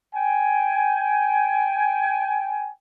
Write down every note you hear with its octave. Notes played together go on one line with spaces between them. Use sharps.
G5 G#5